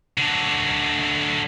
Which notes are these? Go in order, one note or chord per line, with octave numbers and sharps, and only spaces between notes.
D3 F#3